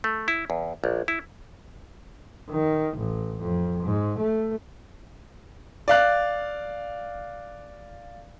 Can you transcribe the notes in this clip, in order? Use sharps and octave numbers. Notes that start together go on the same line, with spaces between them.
A3
E4
E2
A#1
E4
D#3
A1
F2
G#2
A3
D5 F5 F#6